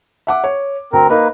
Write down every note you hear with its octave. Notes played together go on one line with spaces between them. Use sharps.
E5 F#5 D6
C#5
D2 C4 A#4
A#3 D#4 A#4 B4 D#5